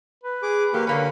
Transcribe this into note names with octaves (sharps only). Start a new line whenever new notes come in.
B4
G#4 D6
F#3 A#3 G4 F5
D3 A#3 C#4 B5